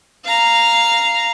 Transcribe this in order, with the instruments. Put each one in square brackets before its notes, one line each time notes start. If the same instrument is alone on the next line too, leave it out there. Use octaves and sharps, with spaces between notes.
[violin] F5 A#5